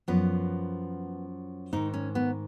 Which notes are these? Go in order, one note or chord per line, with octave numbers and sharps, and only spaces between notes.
F#2 F3 B3
G#2 D#3 D#4
C#4
B3